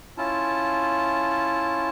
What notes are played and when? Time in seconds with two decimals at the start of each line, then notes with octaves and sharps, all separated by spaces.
0.18 C#4 E4 F4 A5